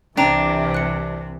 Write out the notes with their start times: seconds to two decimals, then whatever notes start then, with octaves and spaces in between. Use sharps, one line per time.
0.17 C2 C3 E3 D4 G5 A#5
0.75 F#6 C#7